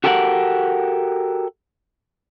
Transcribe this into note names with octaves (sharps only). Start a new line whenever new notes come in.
F#4 G4 A4 A#4 E5 F#5